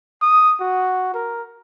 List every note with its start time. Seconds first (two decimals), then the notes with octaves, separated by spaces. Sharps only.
0.22 D#6
0.60 F#4
1.14 A#4